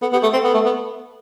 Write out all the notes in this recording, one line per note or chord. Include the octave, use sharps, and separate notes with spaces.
B3 A4
B3 G4
A3 A4
C4 A4
B3
A3
B3